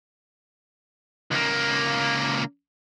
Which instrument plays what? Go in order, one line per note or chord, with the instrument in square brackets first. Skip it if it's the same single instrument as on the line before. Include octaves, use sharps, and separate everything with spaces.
[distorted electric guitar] C#2 A#3